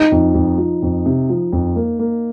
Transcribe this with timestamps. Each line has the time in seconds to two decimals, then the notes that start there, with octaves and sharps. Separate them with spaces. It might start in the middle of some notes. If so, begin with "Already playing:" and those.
Already playing: D#4
0.12 F2
0.34 F2
0.58 F3
0.82 F2
1.06 C3
1.30 F3
1.53 F2
1.76 A#3
1.99 A#3